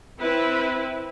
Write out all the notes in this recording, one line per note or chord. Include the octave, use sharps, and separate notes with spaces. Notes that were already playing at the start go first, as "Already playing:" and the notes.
C4 E4 B4